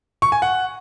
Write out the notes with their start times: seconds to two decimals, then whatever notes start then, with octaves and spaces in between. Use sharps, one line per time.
0.22 C#6
0.32 G#5
0.42 F#5